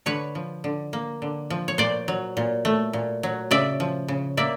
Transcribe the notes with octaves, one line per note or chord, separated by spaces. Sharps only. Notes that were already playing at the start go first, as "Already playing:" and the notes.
D3 B4 C#5
F3
D3
A#3
D3
F3
C#5
A#2 C5 D5
F#3
A#2
A3
A#2
F#3
C#3 D5 E5
F3
C#3
A#3 D5 E5